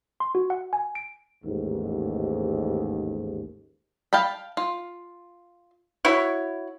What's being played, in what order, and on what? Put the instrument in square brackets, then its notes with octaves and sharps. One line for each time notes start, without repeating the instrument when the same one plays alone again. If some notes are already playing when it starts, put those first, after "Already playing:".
[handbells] C6
F#4
F#5
G#5
D7
[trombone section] A1 D#2 G#2
[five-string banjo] F5 G5 A5 B5
F4
[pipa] E4 F#4 C#5